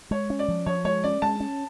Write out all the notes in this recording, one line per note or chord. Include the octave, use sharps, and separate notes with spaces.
G#3 C#5
C#4
D5
F3
F3 C#5
G#3 C#5
C#4 D5
G#3 A5
C#4